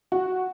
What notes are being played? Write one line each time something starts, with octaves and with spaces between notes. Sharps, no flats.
F#4